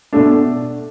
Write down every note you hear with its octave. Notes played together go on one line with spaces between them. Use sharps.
B2 A3 D4